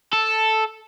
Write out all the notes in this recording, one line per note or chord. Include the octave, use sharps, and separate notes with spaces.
A4